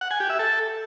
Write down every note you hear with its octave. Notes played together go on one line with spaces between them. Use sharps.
F#5
G#5
G4
E5
A4